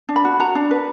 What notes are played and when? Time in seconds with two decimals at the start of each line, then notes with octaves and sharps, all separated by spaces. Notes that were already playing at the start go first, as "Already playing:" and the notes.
0.09 D4
0.16 B5
0.25 F#4
0.40 F#4 A#5
0.55 D4
0.71 B4